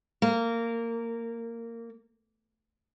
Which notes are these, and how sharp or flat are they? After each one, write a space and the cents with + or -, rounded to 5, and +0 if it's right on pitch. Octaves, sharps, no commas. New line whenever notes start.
A#3 -15 A#5 -15